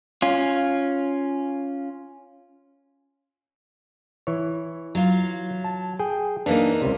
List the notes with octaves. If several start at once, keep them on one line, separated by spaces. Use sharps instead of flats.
C#4 F4
E3 C#5
F#3 F4
A5
G#4 G5
E3 A#3 D4 D#4
C#2 C3